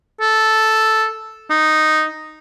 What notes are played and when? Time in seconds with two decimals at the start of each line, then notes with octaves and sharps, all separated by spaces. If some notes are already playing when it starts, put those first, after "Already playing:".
0.21 A4
1.50 D#4